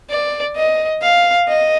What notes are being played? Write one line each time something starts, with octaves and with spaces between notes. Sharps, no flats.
D5
D#5
F5
D#5